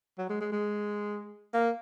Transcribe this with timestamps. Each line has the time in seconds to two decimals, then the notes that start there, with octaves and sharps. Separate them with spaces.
0.18 F#3
0.29 G#3
0.41 G#3
0.52 G#3
1.54 A#3